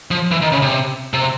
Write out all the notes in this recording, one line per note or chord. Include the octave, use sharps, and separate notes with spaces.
F3
E3
D#3
C#3
C3
C3